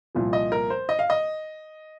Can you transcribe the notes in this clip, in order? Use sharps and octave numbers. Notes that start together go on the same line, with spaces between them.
C2 A#2 F3
D#5
A#4
C5
D#5
F5
D#5